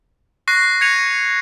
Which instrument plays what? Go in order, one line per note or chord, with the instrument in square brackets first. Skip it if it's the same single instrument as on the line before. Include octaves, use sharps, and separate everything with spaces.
[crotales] C#6 F#6 A#6 C7
G#6 C#7 D#7 F7